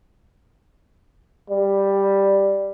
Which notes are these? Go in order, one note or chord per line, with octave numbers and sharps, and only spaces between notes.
G3